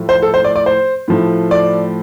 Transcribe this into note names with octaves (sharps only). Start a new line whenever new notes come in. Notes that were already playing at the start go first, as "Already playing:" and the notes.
Already playing: A2 F3 A3
C5
A4
C5
D5
D5
C5
A2 F3 A3
D5